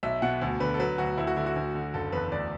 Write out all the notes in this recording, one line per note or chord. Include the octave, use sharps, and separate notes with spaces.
B1 E5
B2 F#5
D2
D3 B4
A4
F#3 B4
D2 F#4
D2 E4
F#4
D3 E4
F#4
D2
D3
F#1 A4
E2 B4
D2 D5